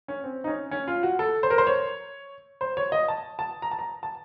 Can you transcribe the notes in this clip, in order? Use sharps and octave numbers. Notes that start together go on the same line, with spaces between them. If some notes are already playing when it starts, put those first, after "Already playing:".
C#4
C4
D#4
C#4
C#4
F4
F#4
A4
C5
A#4
C5
C#5
C5
C#5
D#5
A5
A5
A#5
A5
A#5
A5